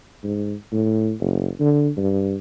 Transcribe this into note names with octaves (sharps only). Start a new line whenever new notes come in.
G#2
A2
F#1
D3
G2